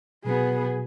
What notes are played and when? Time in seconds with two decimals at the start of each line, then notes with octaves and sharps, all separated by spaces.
0.25 B2 F#3 B3 F#4 G#4